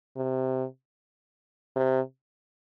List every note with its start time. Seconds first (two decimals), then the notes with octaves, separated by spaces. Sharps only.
0.17 C3
1.76 C3